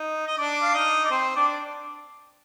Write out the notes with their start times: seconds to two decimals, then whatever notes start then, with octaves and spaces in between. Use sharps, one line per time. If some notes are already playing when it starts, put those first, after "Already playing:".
Already playing: D#4
0.27 D#5
0.38 D4 D5
0.63 F5
0.74 D#4 D#5
1.05 D5
1.11 C4 C5
1.36 D4 D5